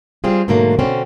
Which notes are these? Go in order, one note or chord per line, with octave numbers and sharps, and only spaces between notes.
G3 C4 F4 G#4
G#2 B2 D3 F#3 A3 A#3
B2 D3 C4 C#4